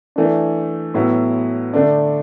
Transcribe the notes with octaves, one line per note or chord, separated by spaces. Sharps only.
E3 A3 D4
A2 F#3 B3 E4
D3 A3 D4